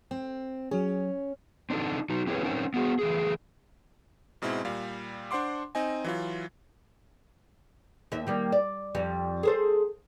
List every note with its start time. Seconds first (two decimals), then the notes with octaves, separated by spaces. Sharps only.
0.11 C4
0.71 F#3 C#4 G#4
1.70 C4 D4 D#4 A4
2.10 F#3 D#4
2.27 C4 E4 G4 G#4 B4 C#5
2.43 C4 C#4 D#4 A#4 C5 C#5
2.74 B3 F#4 G#4
2.99 E3 A3 G#4
4.42 G#2 B2 G#3 C4 E4
4.65 A#2 G3 F5
5.31 D4 C5 F#5 C6 D6
5.75 C4 D#4 D#5 G#5
6.04 E3 F#3 F4
8.12 D#2 E5
8.27 D#3 G3 A#3
8.52 D5
8.95 F2 G3
9.43 G#4 A4 C5